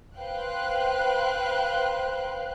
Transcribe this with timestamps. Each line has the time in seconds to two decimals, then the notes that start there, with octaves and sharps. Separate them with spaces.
0.19 B4 C5 F5 G5 F#6